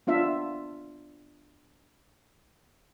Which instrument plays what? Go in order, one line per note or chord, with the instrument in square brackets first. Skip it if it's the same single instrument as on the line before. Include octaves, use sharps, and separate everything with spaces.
[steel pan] B3 D4 F4 E5